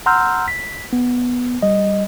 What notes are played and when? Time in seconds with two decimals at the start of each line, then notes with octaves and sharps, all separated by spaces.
0.06 F#5 A#5 C6 E6 F6 G6
0.48 B6
0.93 B3
1.63 G3 D#5